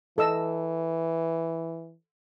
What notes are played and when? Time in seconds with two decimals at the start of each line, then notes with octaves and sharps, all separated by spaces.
0.18 E3 A4 D#5 E6